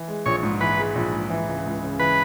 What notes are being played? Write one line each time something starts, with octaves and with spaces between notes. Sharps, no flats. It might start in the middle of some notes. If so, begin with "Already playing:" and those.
Already playing: E3
G#3
A#1 C#5
G#2
E3 B4
G#3
A#1
G#2
E3
C#2
C#2
C#3
E3 B4